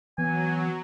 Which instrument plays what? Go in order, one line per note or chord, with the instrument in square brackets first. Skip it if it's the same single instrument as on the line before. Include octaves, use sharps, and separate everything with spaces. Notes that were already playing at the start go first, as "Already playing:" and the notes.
[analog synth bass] E3 [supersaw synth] F#3 [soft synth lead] B3 [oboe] G#5